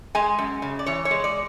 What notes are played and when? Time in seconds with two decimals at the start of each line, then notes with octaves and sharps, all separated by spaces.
0.15 G#3 G#5
0.39 F#2
0.62 C#3
0.79 D5
0.86 E3 C#5
1.05 C#5
1.11 G#3
1.24 D5